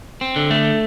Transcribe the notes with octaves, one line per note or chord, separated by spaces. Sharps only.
C4
D3
A3